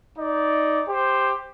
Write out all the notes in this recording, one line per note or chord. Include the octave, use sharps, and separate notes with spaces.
D#4 D5
G4 C5